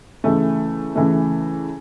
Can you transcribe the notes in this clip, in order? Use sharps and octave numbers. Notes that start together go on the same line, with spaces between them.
C#3 E3 A3
C#3 E3 A3